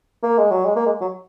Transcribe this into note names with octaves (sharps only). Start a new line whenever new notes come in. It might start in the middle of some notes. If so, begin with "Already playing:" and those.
A#3
G#3
F#3
G#3
A#3
G#3
F#3